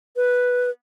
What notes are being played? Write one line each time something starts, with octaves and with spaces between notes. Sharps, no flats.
B4